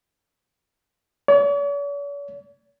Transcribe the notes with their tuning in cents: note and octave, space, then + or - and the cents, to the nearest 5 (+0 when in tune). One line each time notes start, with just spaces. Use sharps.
C#5 +45